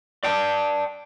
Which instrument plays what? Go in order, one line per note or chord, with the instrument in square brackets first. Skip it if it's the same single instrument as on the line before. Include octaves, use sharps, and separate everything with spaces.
[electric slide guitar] D5 G5 A5